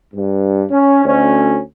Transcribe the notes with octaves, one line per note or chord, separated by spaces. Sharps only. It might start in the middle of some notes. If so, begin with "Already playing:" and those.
G2
C#4
D2 C#4